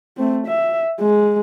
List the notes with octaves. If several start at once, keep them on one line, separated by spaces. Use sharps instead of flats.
A3 C4
E5
G#3